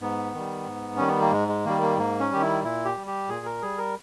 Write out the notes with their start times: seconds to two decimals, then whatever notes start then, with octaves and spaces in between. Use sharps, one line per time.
0.01 G#2 B3
0.34 D#3 G3
0.66 G#2
0.97 D#3 G3 C#4
1.08 B3
1.21 A#3
1.32 G#2 G#3
1.48 G#3
1.65 D#3 G3 A#3
1.82 A#3
1.98 G#2 A#3
2.20 C#4
2.31 D#3 G3 G4
2.41 E4
2.63 A#2 E4
2.85 G4
2.97 G3
3.07 G4
3.29 A#2 G#4
3.46 A#4
3.62 G3 G#4
3.78 A#4